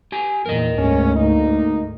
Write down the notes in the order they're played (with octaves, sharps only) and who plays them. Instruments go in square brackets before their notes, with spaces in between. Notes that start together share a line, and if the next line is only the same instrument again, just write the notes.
[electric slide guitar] G4 G#5
[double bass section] E2 A#2 [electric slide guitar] A#4 D#5
[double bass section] D2 G#2 [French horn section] G#3 A#3 C#4
[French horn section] A#3 D#4